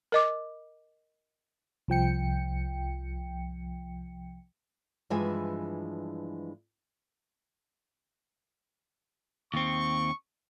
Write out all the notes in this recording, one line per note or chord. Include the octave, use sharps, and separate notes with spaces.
A#4 D#5 D6
C2 F3 G5 C#7
G2 E3 F3 G#3 E5 G#5
D#2 C4 C#6